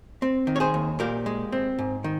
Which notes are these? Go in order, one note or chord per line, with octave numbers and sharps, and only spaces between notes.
C4
D#3
C#5
G#4 C5
D#2
A#2 G4 A#4
G#3
C4
G#2
D#3